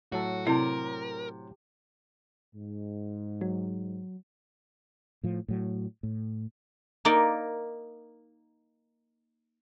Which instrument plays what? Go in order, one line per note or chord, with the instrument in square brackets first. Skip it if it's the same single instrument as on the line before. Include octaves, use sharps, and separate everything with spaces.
[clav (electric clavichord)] A2 F#3 A4 [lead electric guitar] F#4
[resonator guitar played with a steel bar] C3 [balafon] E4 [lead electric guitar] A#4
[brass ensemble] G#2
[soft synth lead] F#3
[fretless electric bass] A2 F3
A2 F#3
A2
[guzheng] A#3 D#4 A#4 D5